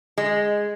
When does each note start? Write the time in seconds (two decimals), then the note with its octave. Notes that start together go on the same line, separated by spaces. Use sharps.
0.18 G#3